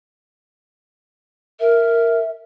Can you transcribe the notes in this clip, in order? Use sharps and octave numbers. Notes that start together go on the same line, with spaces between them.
A#4 E5